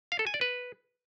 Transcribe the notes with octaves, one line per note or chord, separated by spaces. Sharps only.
F5
A4
G#5
D5
B4